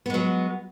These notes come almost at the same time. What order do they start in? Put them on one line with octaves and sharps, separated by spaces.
B3 G#3 F#3